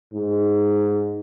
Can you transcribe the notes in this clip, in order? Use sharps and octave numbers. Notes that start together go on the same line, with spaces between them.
G#2